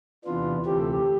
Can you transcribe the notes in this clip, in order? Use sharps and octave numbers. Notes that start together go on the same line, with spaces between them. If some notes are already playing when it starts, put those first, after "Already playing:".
E2 C3 E3 B3 D4 F4
D2 C3 E3 A3 C4 G4
A4
G4